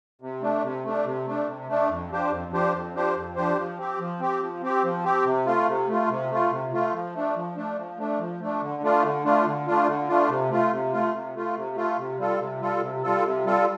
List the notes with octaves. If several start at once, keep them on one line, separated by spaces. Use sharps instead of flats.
C3
A3 D4
C3
A3 D4
C3
A3 D4
C3
A3 D4
F2
F3 D4 G4 C5
F2
F3 D4 G4 C5
F2
F3 D4 G4 C5
F2
F3 D4 G4 C5
F3
C4 G4
F3
C4 G4
F3
C4 G4
F3
C4 G4
C3
A3 F4
C3
A3 F4
C3
A3 F4
C3
A3 F4
F3
A3 D4
F3
A3 D4
F3
A3 D4
F3
A3 D4
D3
A3 D4 F4
D3
A3 D4 F4
D3
A3 D4 F4
D3
A3 D4 F4
C3
A3 F4
C3
A3 F4
C3
A3 F4
C3
A3 F4
C3
G3 F4 A4
C3
G3 F4 A4
C3
G3 F4 A4
C3
G3 F4 A4